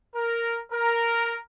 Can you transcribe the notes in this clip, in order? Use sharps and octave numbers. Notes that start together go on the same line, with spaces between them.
A#4
A#4